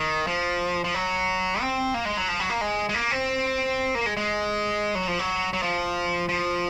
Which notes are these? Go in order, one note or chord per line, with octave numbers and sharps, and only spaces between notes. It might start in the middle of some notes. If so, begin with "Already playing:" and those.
Already playing: D#3
F3
F3
F#3
C4
A#3
G#3
F#3
F3
F#3
A#3
G#3
G#3
A#3
C4
A#3
G#3
G#3
F#3
F3
F#3
F#3
F3
F3